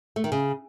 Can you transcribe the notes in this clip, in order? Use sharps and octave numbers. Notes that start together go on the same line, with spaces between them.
A3
D#3
C#3